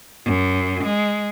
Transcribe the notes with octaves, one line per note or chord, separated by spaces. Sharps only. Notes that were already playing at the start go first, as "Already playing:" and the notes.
F#2
G#3